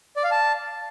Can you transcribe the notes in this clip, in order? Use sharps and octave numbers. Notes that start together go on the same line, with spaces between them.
D5
F5
A5